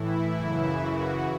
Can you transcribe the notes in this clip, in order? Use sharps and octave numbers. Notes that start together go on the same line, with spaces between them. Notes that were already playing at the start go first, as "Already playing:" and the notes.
Already playing: A2 E3 E4
F#2 C#3 E3
F#4